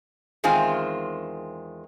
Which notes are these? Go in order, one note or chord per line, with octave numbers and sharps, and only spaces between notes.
E2 D#3 G#3 C4 F4 G#5